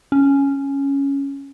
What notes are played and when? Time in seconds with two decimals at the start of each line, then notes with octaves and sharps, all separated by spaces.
0.12 C#4